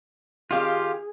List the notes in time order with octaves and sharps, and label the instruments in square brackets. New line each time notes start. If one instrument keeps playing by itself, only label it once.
[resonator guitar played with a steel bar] D#3 C4 F5 [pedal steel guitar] F4 G4 [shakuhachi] G#4